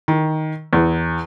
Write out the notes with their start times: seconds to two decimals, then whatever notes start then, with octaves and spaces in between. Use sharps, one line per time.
0.08 D#3
0.73 E2